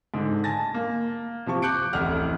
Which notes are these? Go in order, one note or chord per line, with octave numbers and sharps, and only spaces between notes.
G#2 D3
G#5 A5 A6 A#6
A#3
C3 F3 A5 C#6
D6 F#6 G6 C#7 D7
D1 A1 F2 F#5 F6